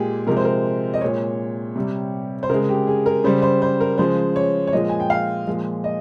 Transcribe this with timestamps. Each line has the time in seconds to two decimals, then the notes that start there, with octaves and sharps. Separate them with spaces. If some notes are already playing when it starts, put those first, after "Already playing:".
Already playing: A#2 G#3 G4 G#4
0.27 C3 F3 G#3 A#4
0.37 C5
0.45 A#4
0.94 D#5
1.01 A#2 G#3 C#5
1.76 C3 G3
2.43 C5
2.49 C#3 G#3 A#4
2.69 G4
2.87 G#4
3.06 A#4
3.24 C#3 G3 C5
3.42 C5
3.62 C5
3.81 A#4
3.98 C#3 F3 G#3 C5
4.36 C#5
4.67 C#5
4.73 A#2 F3 G#3 D#5
4.89 G#5
5.00 G5
5.10 F5
5.47 A#2 F3 G#3
5.84 D#5